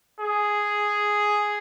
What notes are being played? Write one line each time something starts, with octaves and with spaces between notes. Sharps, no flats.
G#4